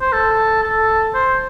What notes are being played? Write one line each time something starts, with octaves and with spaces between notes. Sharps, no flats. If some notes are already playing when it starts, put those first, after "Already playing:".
C5
A4
A4
C5